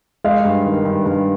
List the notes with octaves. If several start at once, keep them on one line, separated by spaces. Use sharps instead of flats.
G#3 F5
G2
D#3
G2
G2